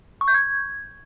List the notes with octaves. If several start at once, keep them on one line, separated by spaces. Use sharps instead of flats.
C#6
G6
G#6